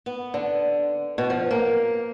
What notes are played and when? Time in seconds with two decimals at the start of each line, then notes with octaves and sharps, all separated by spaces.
0.06 B3
0.34 D3
1.18 B2
1.30 F3
1.51 A#3